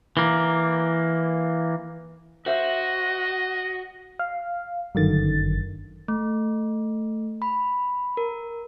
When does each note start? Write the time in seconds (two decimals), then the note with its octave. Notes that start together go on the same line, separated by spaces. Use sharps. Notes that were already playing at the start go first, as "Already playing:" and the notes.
0.17 E3 A#3
2.46 F#4 C5 D#5 E5
4.19 F5
4.95 G1 F#2 D3 D#3 A6
6.08 A3
7.42 B5
8.17 A#4